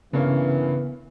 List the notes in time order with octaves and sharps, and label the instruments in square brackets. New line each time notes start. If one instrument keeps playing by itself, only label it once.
[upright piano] G2 A#3 C#4 [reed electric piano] C#3 [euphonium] E3 [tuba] B3